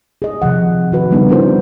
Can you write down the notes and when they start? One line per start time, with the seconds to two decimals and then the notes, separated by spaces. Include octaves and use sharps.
0.22 G#4 D#5
0.42 C3 D#3 F3 F#5
0.92 D#3 F#4 B4
1.11 C#3 G3 B3 C4 D4 D#4
1.29 D4 E4 F#4 A#4 C5